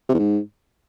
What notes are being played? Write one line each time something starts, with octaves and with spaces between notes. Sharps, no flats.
C3
E2
G#2